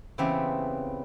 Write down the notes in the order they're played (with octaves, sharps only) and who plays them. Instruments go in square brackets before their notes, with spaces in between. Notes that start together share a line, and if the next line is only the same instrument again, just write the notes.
[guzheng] C#3 E3 B3 C4 E4 G4